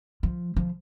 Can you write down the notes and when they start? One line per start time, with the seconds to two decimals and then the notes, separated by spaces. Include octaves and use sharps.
0.23 F3
0.56 F3